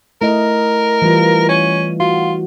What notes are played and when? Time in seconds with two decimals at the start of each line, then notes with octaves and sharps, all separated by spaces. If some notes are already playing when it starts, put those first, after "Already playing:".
0.22 A3 E4 A#4 D#5
1.02 E3 G3 F4
1.49 C#4
2.00 F4 F#4